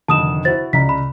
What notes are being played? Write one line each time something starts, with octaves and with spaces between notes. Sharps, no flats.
F1 D2 D#3 A5 D#6 E7
E4 F#4 C5 A6
C#2 D5 A#5 B6
B5